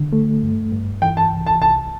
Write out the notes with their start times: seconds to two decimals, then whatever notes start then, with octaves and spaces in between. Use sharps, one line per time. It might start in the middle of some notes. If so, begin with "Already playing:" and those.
Already playing: D3
0.13 A3
0.42 G2
0.72 G2
1.02 E3 G5
1.17 A5
1.32 C2
1.47 A5
1.62 C2 A5